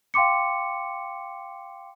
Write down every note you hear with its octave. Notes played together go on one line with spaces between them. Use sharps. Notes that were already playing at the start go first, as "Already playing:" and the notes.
F5 G5 C6 D6 C#7